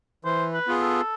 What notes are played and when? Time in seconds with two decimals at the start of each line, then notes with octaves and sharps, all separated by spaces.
0.25 E3 C5
0.54 B4
0.67 B3 F4 G#4
0.81 A4